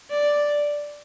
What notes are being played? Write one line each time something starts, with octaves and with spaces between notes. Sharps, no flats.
D5